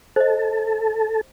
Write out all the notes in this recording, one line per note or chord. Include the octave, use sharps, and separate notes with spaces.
A4 C5 D#5